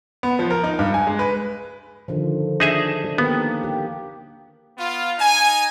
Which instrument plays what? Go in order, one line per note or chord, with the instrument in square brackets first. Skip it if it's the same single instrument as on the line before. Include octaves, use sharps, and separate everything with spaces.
[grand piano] B3
F3
A#4
D#4
G2
G#5
G#3
B4
[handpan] D3 D#3 F3
[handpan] D4 [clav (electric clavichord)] D#4 G#4 E5
[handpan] D#3 A#3 G4 [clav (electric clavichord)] B3
[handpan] G4
[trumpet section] B3 F4
D#4 G#5